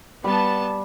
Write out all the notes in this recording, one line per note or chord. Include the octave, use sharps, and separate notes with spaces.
G3 B3 A5